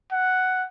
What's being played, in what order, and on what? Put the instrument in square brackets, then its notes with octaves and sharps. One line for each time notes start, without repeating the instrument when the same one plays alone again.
[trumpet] F#5